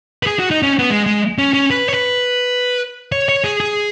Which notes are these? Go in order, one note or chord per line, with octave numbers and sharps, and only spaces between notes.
B4
G#4
F#4
D#4
C#4
B3
G#3
G#3
C#4
C#4
B4
C#5
B4
C#5
C#5
G#4
G#4